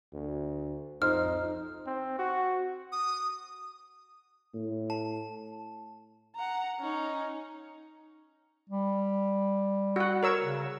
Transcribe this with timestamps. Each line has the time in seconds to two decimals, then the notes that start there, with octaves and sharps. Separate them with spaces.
0.13 D2
1.02 F2 D#4 C5 F6
1.86 C4
2.19 F#4
2.92 D#6
4.54 A2
4.90 A5
6.36 F#5 A#5
6.80 C#4 D#4
8.69 G3
9.96 F#4 F#5
10.23 A#4 C#5 E6
10.42 C#3